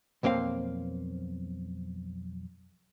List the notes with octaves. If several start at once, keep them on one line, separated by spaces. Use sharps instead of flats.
B1 F2 A#3 C4 F5